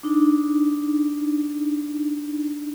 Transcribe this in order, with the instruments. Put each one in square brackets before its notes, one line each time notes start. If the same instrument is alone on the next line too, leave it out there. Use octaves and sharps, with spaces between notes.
[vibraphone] D4 D#4